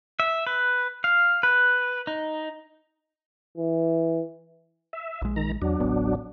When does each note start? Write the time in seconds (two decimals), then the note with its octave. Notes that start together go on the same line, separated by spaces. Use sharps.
0.20 E5
0.47 B4
1.04 F5
1.43 B4
2.07 D#4
3.57 E3
4.93 E5
5.22 A#1 G#3
5.36 D#3 A#5
5.62 E2 F#3 D4
5.80 D1 A1 B3